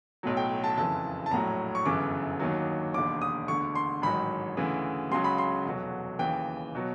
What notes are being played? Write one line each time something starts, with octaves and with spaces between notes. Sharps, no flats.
B1 A2 F#3
G5
A5
F#1 F2 C#3 E3 A5
A5
A#1 A2 F#3 A#5
C#6
G1 F#2 C#3 E3 D6
D#2 D#3 F#3
E1 D#2 D3 D6
D#6
E1 D2 D3 C#6
C6
A1 G#2 D#3 F#3 B5
D2 C#3 E3
C#2 C#3 F#3 C6
B5
C6
F1 E2 B2 F#3
D#2 C#3 E3 G5
B2 F#3